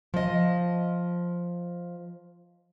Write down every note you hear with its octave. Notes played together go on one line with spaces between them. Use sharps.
F3 D#5